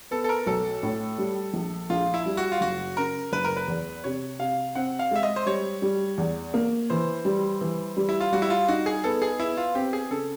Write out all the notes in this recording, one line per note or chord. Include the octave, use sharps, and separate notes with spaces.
B3 A4
A4
A#4
B1 A4
A2
G3
A#1
A#1 F4
E4
G3
F#4
F4
F#1 F#4
C#3 A#4
F#1 B4
A#4
B4
E2
C3 C#5
C3 F5
C4 F#5
F5
G#3 E5
D#5
C5
G3 C#5
G3
E2
A#3
E3 C5
G3
E3
G3
E4
F4
G3 F#4
E4
F4
D#4 F#4
G#4
B3 A4
G#4
B3 E4
F4
C4 G4
G#4
C#3 A4